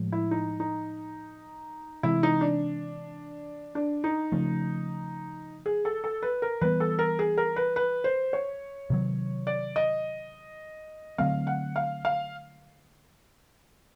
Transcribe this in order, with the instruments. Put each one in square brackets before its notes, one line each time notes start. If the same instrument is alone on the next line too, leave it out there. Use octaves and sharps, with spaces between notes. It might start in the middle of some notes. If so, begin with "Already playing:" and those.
Already playing: [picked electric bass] A2 F3 G#3
[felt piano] E4
D#4
D#4
[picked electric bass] C3 E3 G#3 [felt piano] E4
[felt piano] D#4
D4
D4
D#4
[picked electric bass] C#3 F3 A3
[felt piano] G#4
A4
A4
B4
A#4
[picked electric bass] E3 G3 B3 [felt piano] B4
[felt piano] A4
A#4
G#4
A#4
B4
B4
C5
C#5
[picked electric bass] C3 D#3 F#3
[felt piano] D5
D#5
[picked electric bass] D3 F#3 A3 C4 [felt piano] F5
[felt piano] F#5
F5
F5